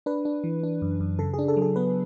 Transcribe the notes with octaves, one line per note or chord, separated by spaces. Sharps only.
D4 B4
D4
E3
D4
F#2
F#2
C#3 A4
G#4
D4
A4
F#3
A4
B3 B4